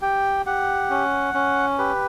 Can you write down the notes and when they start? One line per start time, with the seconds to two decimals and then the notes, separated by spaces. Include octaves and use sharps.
0.02 G4 G5
0.46 G4 F#5
0.90 C#4
1.34 C#4
1.78 G4 B4